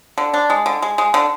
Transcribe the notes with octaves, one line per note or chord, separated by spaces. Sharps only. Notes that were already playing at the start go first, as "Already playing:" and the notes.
D3
D4
G#3
D3
G#3
G#3
D3